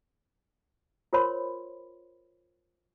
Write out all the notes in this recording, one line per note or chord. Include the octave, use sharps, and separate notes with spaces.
F4 A#4 C5 C#5 B5 C6